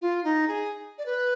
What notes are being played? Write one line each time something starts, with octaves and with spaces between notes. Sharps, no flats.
F4
D#4
G#4
D5
B4